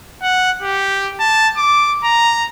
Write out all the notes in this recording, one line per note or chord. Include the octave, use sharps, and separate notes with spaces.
F#5
G4
A5
D6
A#5